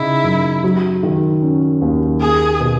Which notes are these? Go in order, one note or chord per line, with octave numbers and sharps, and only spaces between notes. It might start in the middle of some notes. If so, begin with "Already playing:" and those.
Already playing: C#3 D#4 E4
F#2
F#3
D#3
C#4
D#2
A#3 G#4
B2